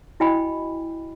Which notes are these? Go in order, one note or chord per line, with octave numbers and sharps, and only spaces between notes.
E4 F#4 D#5 G5 G#5 B5